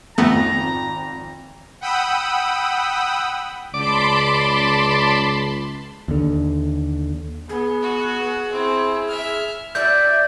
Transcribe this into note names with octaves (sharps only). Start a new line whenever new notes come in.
G#1 F2 A3 B3 A#5
F#5 G5 B5 D#6 E6
C#2 D5 A5 B5 C6 D6
D#2 D3
B3 G#4
F#4
C4 E4
E5 F6
F#4 D5 E5 G6